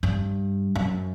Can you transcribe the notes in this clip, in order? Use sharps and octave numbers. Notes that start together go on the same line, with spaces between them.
G2
F#2